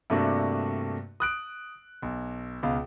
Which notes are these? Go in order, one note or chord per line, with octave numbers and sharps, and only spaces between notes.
G2 C3 A3 A#3 D4 F#4
D#6 F#6 D7
B1
C#2 B2 F5